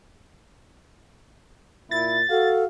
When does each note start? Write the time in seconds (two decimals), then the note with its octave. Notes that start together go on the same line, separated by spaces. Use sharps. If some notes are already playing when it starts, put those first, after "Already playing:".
1.91 A#2 E4 A6
2.30 F#4 A4 F5